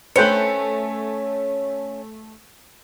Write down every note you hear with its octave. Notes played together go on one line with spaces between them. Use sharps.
A3 C#4 B4 C5 G5 C#7